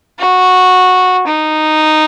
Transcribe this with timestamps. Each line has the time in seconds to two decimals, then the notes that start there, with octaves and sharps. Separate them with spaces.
0.19 F#4
1.27 D#4